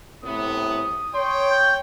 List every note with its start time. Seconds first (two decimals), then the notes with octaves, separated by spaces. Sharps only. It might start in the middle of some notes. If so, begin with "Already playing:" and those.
0.24 A2 C3 B3 D#6
1.15 C#5 G5 C6
1.50 G6